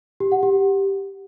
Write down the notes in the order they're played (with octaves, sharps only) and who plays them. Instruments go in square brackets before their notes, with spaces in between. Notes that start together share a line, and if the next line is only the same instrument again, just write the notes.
[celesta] G4
F#5
G4